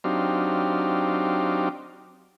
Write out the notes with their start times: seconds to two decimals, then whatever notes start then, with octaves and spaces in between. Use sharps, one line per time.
0.04 F#3 C4 D4 D#4 G4 F5